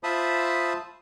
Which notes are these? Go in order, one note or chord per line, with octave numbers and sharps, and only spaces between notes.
F4 C5 E5 A5 B5 D#6